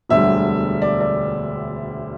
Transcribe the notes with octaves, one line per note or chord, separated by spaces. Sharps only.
E1 D2 D3 G3 E5
D5
D5